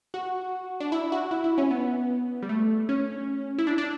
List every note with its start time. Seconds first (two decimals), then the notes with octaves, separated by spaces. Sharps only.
0.14 F#4
0.80 D4
0.92 E4
1.12 F#4
1.31 E4
1.44 E4
1.58 C#4
1.71 B3
2.42 G3
2.49 A3
2.89 C#4
3.58 E4
3.67 D4
3.78 D4